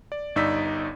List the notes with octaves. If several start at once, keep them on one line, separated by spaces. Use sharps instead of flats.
D5
G1 G2 D#4 D5 E6 B6